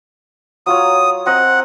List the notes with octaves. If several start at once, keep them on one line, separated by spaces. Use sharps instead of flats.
F#3 F4 C#5 D#6
C4 D#5 F#5 A#5